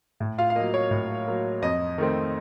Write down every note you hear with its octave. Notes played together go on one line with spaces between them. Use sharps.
A2
F4 F5
F5
F#3 A#3 D#5
C#5
A2
F#3 A#3
F2 D#5
D#3 A3 C4